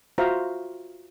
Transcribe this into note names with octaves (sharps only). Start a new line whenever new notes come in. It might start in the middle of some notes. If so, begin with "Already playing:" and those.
F4 F#4 C5 E5 F5 A#5